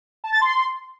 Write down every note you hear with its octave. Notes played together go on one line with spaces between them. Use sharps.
A5
A6
C6